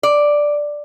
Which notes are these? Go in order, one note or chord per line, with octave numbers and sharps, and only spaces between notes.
D5